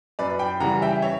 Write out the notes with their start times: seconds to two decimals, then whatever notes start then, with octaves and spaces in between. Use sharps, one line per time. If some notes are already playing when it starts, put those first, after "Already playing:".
0.19 F#2 B4 D5
0.39 G5 B5
0.60 C#3 E3 G3 F#5 A#5
0.82 E5 G5
1.02 C#5 E5